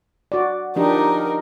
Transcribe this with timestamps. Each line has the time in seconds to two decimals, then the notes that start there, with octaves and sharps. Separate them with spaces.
0.32 F#4 D5
0.76 F3 D4 D#4 G4 A#4